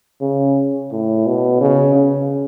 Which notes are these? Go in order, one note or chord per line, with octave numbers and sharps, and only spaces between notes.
C#3
A2
B2
C#3
C#3